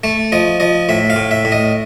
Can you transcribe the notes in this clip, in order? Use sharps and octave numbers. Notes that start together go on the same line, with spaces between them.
A3 A5
F3 D#5
F3 D#5
A2 E5
F5
A2
E5
A2
D#5